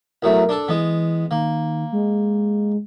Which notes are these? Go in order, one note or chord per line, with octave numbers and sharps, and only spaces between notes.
E2 F#3 A3 A#4
D4 A4
E3 G#3 B3
D#3 A#3
G#3